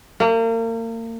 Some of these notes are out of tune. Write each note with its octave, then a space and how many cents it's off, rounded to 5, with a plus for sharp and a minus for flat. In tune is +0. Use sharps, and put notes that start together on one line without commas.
A#3 -35